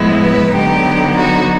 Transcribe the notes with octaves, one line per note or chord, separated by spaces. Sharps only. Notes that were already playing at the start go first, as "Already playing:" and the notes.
Already playing: A2 F3 G#3 B3 E4
B4
D3 F#3 B3 D#4 G4
F#4